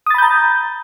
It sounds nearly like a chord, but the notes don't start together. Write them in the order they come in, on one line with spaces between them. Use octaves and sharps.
D#6 A6 B5 G6 A#5